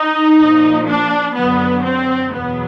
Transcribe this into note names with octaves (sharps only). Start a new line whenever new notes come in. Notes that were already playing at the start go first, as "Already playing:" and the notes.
Already playing: D#4
A#2 F3
D4
F#2 D3 F#3 B3
C4
E2 B2 F#3 B3